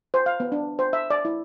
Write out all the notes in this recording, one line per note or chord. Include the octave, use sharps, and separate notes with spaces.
C5
F5
B3
D4
C5
E5
D5
E4